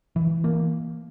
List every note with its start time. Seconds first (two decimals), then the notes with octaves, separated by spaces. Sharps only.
0.16 E3
0.44 A#3